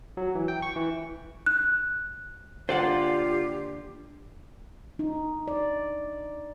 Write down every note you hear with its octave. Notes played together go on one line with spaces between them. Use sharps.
F#3
E3
G5
C#6
E3
F#6
D3 A#3 F4 G4 C5 D5 F#5
D#4
D5